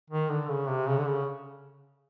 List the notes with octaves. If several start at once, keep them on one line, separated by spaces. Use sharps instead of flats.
D#3
D3
C#3
C3
C#3
D3
C#3